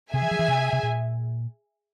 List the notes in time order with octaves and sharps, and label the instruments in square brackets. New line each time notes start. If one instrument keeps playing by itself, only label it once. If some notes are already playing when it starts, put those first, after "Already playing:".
[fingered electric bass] C3 [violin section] G#4 E5 G#5
[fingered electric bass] E3
F3
E3
C3
C3
A#2